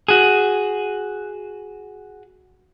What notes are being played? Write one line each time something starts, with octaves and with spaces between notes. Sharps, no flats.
F#4 G#4